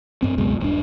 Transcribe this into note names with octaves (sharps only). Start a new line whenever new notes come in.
G2 C4
C#2 F#2 B2 G#3
D#1 G2 D4